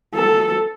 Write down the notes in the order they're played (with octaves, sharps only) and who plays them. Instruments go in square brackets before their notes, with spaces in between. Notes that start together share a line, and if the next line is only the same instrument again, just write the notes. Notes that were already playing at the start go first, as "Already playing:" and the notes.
[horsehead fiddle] A4